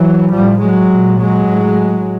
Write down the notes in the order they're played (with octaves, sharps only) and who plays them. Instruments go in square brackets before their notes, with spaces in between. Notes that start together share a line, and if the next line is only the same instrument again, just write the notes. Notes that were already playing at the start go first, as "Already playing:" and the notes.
Already playing: [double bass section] E3 F#3
A2 F3 G3
F#3 G#3
A#2
F#3 G#3
A2